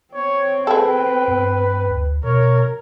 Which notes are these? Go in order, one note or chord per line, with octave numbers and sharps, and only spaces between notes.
C4 C#5 G5
G#4 A4 B4
G2
D2
B2 A#4 C#5